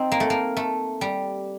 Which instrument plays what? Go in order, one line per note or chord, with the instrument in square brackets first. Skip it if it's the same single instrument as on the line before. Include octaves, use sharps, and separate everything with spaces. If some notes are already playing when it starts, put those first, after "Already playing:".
Already playing: [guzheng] C4 D#4
A#3
A3
A#3
A3
G3